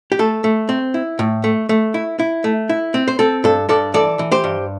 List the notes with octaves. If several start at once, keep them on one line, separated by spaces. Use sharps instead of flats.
G4
A3 A4
A3
C4
E4
A2
A3
A3
E4
E4
A3
E4
C4
C5
C4 A4
G2 A4
G2 A4 D5
E3 A4 D5
E3
G4 C5
G2